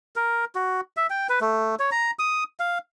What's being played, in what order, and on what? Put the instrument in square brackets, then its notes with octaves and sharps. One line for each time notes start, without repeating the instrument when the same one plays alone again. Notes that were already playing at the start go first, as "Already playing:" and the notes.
[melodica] A#4
F#4
E5
G5
B4
A3
C#5
A#5
D#6
F5